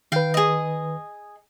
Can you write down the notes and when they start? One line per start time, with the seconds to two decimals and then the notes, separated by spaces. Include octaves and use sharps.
0.12 D#3 B4 F5 G5
0.34 G#4 D#5